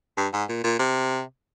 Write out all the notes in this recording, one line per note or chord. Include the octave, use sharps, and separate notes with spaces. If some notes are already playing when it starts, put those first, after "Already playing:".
G2
G#2
A#2
A#2
C3